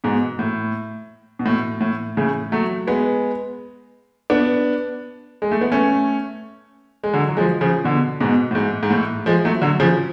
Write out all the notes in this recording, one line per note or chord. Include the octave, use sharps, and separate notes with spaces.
G#2 B2
A2
B2
A2
A2
A2 C#3
F#3 A3
G#3 B3
B3 D4
G#3
A3
B3
A3 C#4
G#3
D3 F#3
F#3
F3 G#3
C#3 F3
B2 D3
G#2 B2
A2
G#2
G#2
A2
F3 G#3
F#3 A3
D3 F#3
C#3 F3